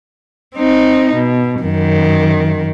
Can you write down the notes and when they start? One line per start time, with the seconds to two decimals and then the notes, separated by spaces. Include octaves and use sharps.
0.55 C4 D#4
1.14 B2
1.62 F#2 D#3